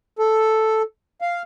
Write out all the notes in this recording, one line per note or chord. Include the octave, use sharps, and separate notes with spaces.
A4
F5